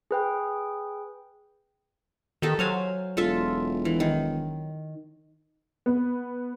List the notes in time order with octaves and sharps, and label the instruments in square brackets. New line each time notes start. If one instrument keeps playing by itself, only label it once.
[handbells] G#4 B4 G5
[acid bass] D#3 [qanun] G4 A4 E5
[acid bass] F#3 [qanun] C5 F5 G#5
[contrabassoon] E1 [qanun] F4 A4 E5
[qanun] E3
D#3
[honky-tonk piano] B3